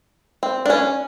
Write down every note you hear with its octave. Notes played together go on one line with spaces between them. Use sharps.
C4
D4
C#4